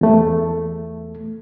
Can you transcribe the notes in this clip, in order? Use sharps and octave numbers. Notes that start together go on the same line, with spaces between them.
E2 A3